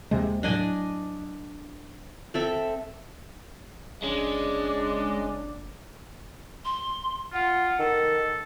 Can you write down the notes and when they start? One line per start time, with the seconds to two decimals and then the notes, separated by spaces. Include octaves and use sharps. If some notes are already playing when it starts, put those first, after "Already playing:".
0.11 D#2 C3 G#3
0.43 A2 F#3 D4 D#5 G#5
2.34 C4 A4 E5
4.04 F#1 G#3 C#4 D4
6.65 C6
7.33 F4 F#5
7.80 D#3 A4